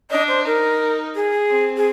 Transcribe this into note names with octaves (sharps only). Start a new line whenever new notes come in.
D4 D#5
C5
D#4 A#4
G#4
C4
G#4